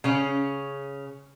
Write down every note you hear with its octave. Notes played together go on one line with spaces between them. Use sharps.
C#3 C#4